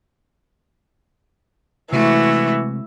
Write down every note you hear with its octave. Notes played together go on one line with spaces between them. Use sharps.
C3 E3 G#3 A3 F#4